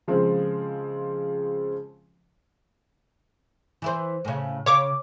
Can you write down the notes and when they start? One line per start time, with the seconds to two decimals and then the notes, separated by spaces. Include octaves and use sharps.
0.08 C#3 F3 G#3 C4
3.82 E3 E4 C5
4.25 A2 C#3
4.66 C#3 C#5 D6